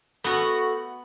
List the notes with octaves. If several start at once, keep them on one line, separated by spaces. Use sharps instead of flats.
A3 B3 F#4 F#5